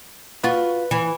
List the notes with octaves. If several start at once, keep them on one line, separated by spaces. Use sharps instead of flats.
F4 F#4 B4
E3